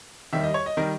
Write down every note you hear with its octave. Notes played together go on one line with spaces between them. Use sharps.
D#2 D#3 G3 E5
D#5
C#5
D#5
D#3 G3 A#4